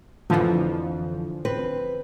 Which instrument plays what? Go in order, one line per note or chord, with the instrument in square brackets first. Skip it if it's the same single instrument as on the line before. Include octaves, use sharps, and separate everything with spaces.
[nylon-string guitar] F2 G#2 [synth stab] D3 E3 F3
[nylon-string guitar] C4 B4